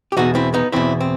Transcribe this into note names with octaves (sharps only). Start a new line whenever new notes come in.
G4
E2 B2 D#4 F#4
C4 E4
B3 D#4
E2 B2 C4 E4
C4